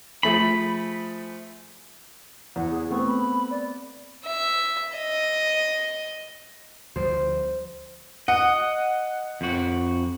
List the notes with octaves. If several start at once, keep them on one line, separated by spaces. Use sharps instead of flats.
F3 A3 G#4 B5
E2 F#5
G#4
A3 B3 C4 C#6
B5
D5
E5
D#5
D2 F3 G3 C5
D#5 F#5
F2 F#4